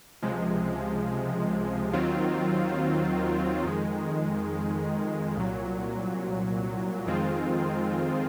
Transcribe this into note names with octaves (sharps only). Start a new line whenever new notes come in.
C#2 C3 F3 G#3
D#2 D#3 F#3 C4 F4
F2 D#3 G#3
C2 A#2 F#3
F2 D#3 G#3 C4 F4